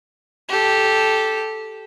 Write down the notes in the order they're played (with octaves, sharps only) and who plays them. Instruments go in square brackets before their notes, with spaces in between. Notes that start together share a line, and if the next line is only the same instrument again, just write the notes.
[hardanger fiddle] G4 A4